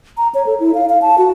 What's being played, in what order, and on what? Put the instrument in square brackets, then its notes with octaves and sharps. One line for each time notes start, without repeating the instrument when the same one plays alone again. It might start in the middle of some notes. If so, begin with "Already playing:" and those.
[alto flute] A#5
C#5
A4
E4
F5
F5
A5
F#4